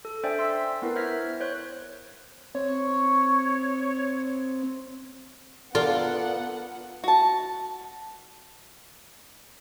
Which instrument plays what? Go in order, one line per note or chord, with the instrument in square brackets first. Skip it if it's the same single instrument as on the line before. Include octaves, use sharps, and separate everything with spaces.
[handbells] A4
D4 C5 D5 E5 G5 G#5
C6 E6 B6
B3 E4 A#4 B4
C5 E5 F6 G#6 A#6 B6
C5 C#5 F#6 B6
[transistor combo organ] C4 [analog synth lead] C#5
[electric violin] B3 F#5 [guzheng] F4 [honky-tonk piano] A4 A#4 [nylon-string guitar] D5
[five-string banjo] F#4 A5